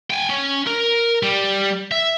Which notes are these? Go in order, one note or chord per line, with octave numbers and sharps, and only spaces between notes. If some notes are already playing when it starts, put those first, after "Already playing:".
G5 G#5
C#4
A#4
G3
E5